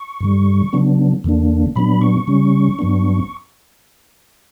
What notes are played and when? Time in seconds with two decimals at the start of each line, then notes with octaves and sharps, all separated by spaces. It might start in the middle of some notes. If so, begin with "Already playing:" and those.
Already playing: C#6
0.21 G2 D3 G3
0.73 C#3 F#3 B3 D4
1.24 E2 D3 A#3 D4
1.76 A#2 F#3 B3 D4 B5
2.01 C#6
2.27 C#3 G3 C#4
2.79 G2 F#3 B3 D4